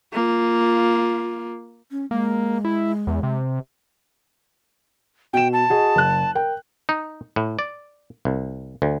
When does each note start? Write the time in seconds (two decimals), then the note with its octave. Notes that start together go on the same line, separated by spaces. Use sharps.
0.14 A#3 F4
1.90 C#4
2.11 G#3 A#3
2.65 E4
3.07 E2
3.23 C3
5.33 B2 G5 E7
5.53 A5
5.70 F#4 G#4 D#5
5.96 F#1 F#6
6.35 A#4 G5
6.89 D#4
7.36 A2
7.59 D5
8.25 C2
8.82 D2